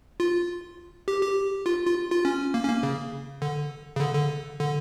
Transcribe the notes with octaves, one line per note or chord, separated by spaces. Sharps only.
F4
G4
G4
F4
F4
F4
C#4
A#3
C#4
A#3
C#3
D3
C#3
D3
D3
D3